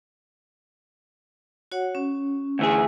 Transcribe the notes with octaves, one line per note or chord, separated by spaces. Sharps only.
F#4 C#5 F#5
C#4
D2 E3 G#4